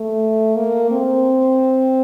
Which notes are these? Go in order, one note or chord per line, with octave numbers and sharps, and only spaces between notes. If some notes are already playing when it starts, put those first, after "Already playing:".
Already playing: A3
A#3
C4